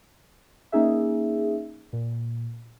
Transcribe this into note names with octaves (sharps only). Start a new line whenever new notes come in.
A#3 C#4 D#4 G#4 E5
A#2